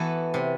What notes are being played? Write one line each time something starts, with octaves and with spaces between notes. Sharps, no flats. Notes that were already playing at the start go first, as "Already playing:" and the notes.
Already playing: E3 B3 F#4 A4
C3